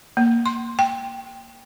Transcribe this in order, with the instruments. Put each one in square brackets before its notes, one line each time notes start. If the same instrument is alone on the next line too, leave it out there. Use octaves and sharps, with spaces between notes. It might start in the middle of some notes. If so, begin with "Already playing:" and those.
[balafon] A#3
C6
G5